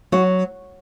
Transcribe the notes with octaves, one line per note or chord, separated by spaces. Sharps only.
F#3 F#4